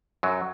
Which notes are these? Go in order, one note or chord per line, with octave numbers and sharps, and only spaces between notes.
F#2 F#3